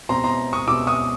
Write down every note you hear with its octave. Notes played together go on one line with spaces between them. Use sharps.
B2 G3 C4 A#5 C6
A#5 C6
C#6 D#6
B2 G3 C4 D6 E6
C#6 D#6